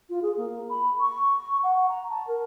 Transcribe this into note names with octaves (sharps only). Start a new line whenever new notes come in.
F4
G#4
A#3
B5
C#6
F#5
A#5
A5
A#4